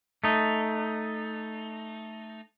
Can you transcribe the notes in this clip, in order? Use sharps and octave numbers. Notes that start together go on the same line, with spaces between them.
A3 D#4